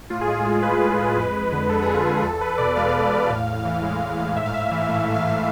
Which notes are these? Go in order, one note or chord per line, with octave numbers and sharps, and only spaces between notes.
A2 F4
G#4
G#3
F4
G#3
A2 B4
A2
G#3
F2 B4
F2
D3
G#3 A4
F2 G#4
F4
F2 G#4
E2 A4
E2 B4
B2 D5
G#3 F5
E2
E2
A2
A2
E3
G#3
A2
A2
G#2 E5
F5
G#2 E5
E3
A3 E5
G#2
F5
G#2